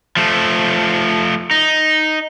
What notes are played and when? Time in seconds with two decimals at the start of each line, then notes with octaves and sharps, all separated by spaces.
0.17 F3 A3
1.51 D#4